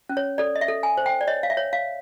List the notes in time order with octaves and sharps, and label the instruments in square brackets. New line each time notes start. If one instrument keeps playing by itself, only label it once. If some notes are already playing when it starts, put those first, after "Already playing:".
[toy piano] C#4
C#5
A4 D5
D#5
E5
A4
G#5
C5
G5
D5
C#5 D#5
F5
E5
C#5
F5